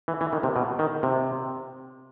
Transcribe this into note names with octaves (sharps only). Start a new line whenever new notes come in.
E3
E3
D#3
C3
B2
D#3
C3